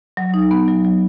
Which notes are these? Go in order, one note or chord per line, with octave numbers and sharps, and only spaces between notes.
F#3
D#4
B3
F#3
F#3